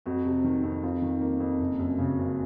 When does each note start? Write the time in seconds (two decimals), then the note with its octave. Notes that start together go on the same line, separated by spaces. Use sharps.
0.06 F2 F#4
0.25 C3
0.44 D#3
0.64 F2
0.83 F2 F4
1.02 D#3
1.21 A#3
1.40 F2
1.59 F#1
1.79 F#2
1.98 C#3
2.18 F#1